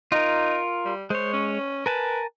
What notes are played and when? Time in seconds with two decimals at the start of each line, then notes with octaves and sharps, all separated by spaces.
0.12 D#4 F4 A#4
0.85 G3
1.10 G#3 C5 C#5
1.33 C#4
1.86 A#4 B4 G#5 A5